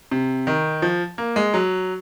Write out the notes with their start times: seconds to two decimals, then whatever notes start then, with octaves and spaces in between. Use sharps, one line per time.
0.11 C3
0.47 D#3
0.82 F3
1.18 A#3
1.36 G#3
1.54 F#3